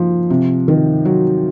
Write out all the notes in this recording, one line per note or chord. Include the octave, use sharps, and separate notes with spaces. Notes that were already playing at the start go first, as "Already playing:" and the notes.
Already playing: F3 A#3 D#4
C3
D#3
F#3